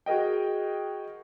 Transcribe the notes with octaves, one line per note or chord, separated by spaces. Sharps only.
F#4 G#4 A#4 D#5 G5